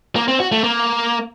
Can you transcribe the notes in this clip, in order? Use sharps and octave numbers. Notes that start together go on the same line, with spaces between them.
A#3
C4
F#4
A3
A#3